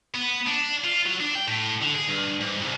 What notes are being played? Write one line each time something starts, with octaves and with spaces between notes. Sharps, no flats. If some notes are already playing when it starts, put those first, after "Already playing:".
B3
D4
F4
F#3
D4
G5
A2
D3
G#4
G2
G#2
C2